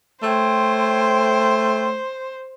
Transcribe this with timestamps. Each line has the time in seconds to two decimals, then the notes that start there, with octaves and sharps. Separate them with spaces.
0.22 A3 C5 C#5 G5 C6